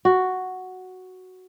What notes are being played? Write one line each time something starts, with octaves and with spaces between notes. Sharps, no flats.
F#4